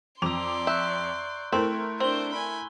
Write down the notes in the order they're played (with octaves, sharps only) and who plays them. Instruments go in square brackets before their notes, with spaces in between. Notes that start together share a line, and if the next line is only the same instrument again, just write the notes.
[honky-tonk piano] F2 D6 F7 [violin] D5 C6 [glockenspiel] A#5 E6
[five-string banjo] E5 [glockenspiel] C#6 F#6 G6
[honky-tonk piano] A3 E4 A#4 [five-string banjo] C4 [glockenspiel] C6
[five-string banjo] C4 [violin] D4 C5 [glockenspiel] E6 G7
[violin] G#5 B5